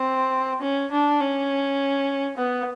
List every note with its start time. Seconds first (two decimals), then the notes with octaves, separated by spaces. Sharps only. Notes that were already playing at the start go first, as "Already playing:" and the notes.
Already playing: C4
0.61 C#4
0.91 D4
1.21 C#4
2.37 B3